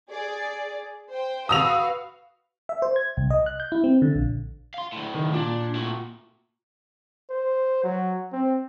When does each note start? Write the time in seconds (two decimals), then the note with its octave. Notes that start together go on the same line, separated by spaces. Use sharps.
0.11 G#4 D5
1.11 C5 G5
1.49 F#4 B4 F5 D#6 E6 F7
2.69 E5
2.82 C5
2.96 G#6
3.17 C2
3.30 D#5
3.46 F#6
3.60 G6
3.72 E4
3.84 C4
4.02 D3
4.15 A#1
4.74 F5 C6
4.92 D2 A2
5.14 D#3
5.34 A#2 D4
5.75 A2 F#4
7.30 C5
7.84 F#3
8.32 C4